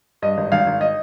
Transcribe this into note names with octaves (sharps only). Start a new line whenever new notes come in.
G2 D#5
G#1
G#1 F5
G#1
D#5